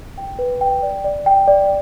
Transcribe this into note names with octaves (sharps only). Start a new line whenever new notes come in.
G5
B4
G5
D5
D5
G5
D5